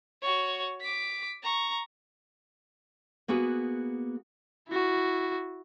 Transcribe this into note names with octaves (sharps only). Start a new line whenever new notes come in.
F#4 C#5
D6 B6
A#5 C#6
A#3 B3 F#4 G#4 B4
E4 F#4